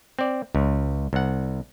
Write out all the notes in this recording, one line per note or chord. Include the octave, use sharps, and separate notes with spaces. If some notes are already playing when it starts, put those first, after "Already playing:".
C4 D5
C#2
C2 F#5